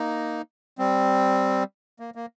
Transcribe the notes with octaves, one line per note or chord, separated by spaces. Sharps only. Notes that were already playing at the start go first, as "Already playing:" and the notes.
Already playing: A#3 D#4
G3 C4
A#3
A#3